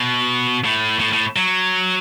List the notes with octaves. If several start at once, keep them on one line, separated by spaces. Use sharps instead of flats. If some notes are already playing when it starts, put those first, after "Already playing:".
Already playing: B2
A2
A2
A2
F#3